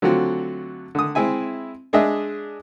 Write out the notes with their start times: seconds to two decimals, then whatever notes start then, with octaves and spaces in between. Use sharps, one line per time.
0.02 D3 F#3 A3 C4 F4 F#4
0.95 D3 D#6
1.15 G#3 C4 E4 E5 G#5
1.93 G#3 D4 G#4 D#5 E5